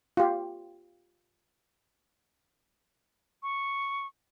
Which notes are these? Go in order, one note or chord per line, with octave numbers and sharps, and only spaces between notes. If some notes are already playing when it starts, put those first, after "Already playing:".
F4 G4
C#6